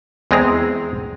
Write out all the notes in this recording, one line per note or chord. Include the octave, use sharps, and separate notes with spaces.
E2 G#3 C4 G#4 A#5